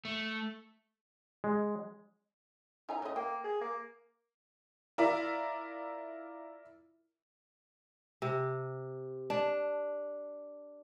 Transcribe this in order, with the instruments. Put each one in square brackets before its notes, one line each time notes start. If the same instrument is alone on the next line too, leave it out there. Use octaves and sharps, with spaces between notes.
[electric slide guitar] A3
[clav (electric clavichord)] G#3
[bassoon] D#4 [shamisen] E4 G#5 A#5
[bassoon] A2 [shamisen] C#3 D#5
[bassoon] A#3 [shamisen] G5
[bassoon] G#4
A#3
[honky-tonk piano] E4 F4 A#4 D5 E5
[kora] C3
D4